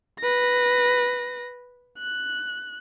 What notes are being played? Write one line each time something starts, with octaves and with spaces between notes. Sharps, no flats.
B4 A#6
F#6